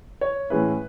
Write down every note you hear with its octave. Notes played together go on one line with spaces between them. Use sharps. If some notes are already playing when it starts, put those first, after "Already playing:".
C#5
A2 E3 G#3 C#4 E4 B4